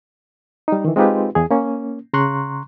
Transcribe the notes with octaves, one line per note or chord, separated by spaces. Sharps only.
G3 D#4
D#3 E3
G#3 C4 D#4 F4 G4 B4
E2 G#4
A#3 C#4
C#3 A#5 C6 C#6 F#6